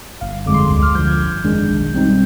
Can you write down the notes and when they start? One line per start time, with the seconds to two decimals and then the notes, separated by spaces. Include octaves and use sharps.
0.21 G1 F5
0.46 F2 D3 G#3 D6
0.54 C6
0.70 D2 D6
0.82 F6
0.95 D3 F3 G6
1.08 G#6
1.19 G1 G6
1.44 F2 D#3 G#3 D4
1.69 B1
1.93 B2 G3 C4 D#4